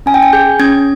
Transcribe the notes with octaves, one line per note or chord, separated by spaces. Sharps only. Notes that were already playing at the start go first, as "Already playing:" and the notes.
C#4 G#5
G5
G#5
G#4 G6
C#4 G#6